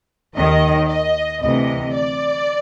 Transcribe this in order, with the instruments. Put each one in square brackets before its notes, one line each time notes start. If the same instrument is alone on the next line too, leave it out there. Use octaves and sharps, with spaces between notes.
[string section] D#2 D#3 D#5
D#5
D2 C3 E3 D#5
D5